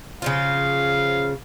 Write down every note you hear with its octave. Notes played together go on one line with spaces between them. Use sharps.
C#3 F3 F4 F5